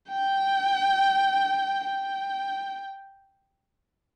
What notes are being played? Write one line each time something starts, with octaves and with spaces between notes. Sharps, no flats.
G5
G5